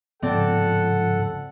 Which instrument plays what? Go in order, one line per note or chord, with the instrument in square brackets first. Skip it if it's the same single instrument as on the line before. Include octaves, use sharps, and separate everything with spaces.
[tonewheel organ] G#2 C#3 F3 [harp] C4 D5 [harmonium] A4 [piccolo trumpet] F#5